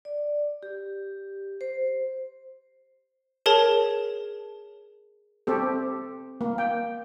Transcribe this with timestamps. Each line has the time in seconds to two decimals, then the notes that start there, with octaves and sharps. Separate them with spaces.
0.05 D5
0.63 G4
1.61 C5
3.46 G#4 A#4 C#5 A5
5.47 C4 G4 A4
6.41 A#3
6.58 G5